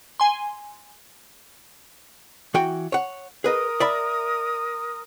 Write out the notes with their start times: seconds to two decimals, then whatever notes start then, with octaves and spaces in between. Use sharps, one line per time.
0.20 G#5 C6
2.54 E3 F#4 G5
2.92 C#5 F#5
3.44 G#4 A#4 B4 D#5 D#6
3.80 D5 E5 B5